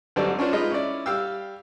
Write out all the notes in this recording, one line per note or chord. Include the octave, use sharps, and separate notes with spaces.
G#1 D3 F#3 G3 C5 D5
C#4 D4 F4 C5
G#3 D#4 F4 B4 D#5
C#4 E4 D5
G3 G4 F5 G5 E6